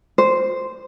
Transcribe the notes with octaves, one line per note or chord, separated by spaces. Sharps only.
C5